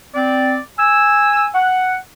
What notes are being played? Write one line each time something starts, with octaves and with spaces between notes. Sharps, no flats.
C4 D5
G#5 E6
F#5